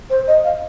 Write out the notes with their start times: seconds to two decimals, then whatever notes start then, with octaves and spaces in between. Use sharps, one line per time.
0.10 C5
0.27 D#5
0.44 F5